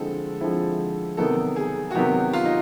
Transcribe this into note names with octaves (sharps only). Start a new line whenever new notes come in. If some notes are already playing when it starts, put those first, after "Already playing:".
Already playing: D3 F3 G#3 C4 E4 A4
D3 F3 G#3 C4 E4
C3 D#3 F#3 B3 A4
G#4
F#4
C3 D#3 F#3 B3 G4
F4
D#4